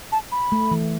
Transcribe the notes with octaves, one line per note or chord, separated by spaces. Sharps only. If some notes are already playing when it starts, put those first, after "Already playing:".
A5
B5
A3
E3